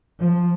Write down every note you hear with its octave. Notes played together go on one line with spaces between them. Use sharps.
F3